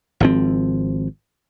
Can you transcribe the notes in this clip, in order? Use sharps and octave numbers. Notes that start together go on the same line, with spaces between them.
G#1 F3 C4